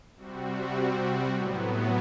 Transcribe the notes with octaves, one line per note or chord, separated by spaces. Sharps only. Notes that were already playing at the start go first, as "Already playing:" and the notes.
C3 G3 C4 F#4
A2 F#3 B3